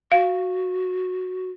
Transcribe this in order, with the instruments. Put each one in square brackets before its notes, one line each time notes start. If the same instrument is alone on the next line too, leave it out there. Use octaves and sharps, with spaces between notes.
[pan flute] F#4 [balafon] F5